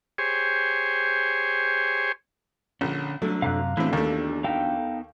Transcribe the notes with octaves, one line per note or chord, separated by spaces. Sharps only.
G4 G#4 C5 C#5 G#5
A#1 D3 C#4
C2 D3 F#3 A3
F#2 C3 F5 A#5 F#6
E2 A2 D3 E3 C4
D#2 A3 D4 G4
B3 D#4 A4 F5 G5